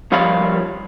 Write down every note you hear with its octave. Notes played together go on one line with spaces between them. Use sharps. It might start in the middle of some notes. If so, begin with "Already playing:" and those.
D#2 F3 G3 C#5 F5 B5